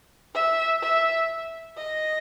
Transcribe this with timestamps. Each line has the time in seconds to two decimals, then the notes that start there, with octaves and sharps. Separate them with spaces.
0.34 E5
0.82 E5
1.78 D#5